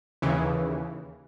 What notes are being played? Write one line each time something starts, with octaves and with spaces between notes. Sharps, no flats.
D#2 C#3 E3